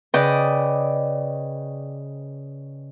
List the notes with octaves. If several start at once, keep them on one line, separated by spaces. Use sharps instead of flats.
C#3 B4 D5 D#5 G5